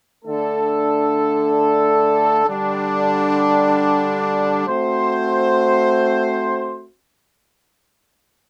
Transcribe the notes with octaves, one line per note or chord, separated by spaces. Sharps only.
D3 A3 D4 A4
D3 G3 D4
A3 C4 F#4 C5